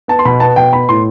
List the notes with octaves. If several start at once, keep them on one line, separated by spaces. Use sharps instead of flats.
B3 A5
C6
B2 B5
B3 A5
B2 G5
B3 B5
A2 C6